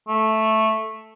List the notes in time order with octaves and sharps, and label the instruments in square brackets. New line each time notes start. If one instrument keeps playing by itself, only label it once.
[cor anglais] A3